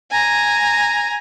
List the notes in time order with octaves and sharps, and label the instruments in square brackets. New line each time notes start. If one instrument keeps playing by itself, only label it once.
[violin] G#5 A#5